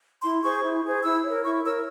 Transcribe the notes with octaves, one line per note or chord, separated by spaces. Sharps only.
E4 C6
G#4 C5 C#6
E4
G#4 C5
E4 E6
A#4 C#5
E4 C#6
A#4 C#5 E6